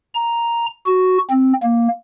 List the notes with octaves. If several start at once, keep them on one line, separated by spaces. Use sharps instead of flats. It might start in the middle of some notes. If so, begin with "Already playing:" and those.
A#5
F#4
C4
A#3